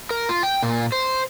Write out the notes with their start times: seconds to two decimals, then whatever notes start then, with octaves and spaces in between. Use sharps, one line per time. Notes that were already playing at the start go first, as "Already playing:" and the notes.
0.11 A#4
0.29 F4
0.43 G5
0.63 A#2
0.92 C5